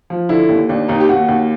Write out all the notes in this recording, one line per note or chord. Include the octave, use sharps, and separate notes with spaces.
F3
D3 E4
D#2
D#2 D4
D#2 D#4
G4
D#2 F#4
D#2